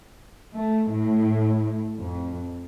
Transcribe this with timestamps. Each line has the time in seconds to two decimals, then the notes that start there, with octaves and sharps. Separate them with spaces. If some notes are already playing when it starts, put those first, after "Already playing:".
0.55 A3
0.93 A2
1.98 F2